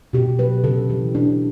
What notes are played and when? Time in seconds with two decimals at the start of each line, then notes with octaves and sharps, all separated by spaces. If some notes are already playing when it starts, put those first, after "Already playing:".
0.13 B2 G4
0.39 F#3 B4
0.64 C#3 A4
0.90 E3 G4
1.15 B2 D4